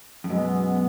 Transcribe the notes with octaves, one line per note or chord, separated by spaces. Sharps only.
F2
F#2 B2 G#3 B3